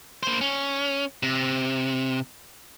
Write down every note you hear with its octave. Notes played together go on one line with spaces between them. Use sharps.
A#3 C5
C#4
C3